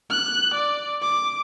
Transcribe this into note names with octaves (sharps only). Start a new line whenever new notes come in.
F#6
D5
D6